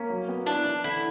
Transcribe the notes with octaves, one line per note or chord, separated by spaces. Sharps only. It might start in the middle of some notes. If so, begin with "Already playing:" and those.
Already playing: A#3 C#4
F#3
B3
D4 E4
E3
D3 E4